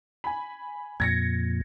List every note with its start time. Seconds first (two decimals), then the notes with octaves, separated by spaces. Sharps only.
0.24 G#5 B5
1.00 F2 A#2 G#6 A#6 C#7